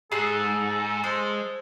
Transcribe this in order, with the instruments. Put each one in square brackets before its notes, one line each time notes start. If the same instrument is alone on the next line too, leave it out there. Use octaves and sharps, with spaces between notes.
[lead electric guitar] G#2 [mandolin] G#4 F#6 [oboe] A4
[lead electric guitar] G#3 [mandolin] C5